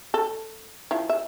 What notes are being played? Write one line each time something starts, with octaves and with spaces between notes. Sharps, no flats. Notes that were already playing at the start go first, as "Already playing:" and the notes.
A4
F3 E4
E5